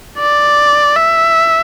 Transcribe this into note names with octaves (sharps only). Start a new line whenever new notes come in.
D5
E5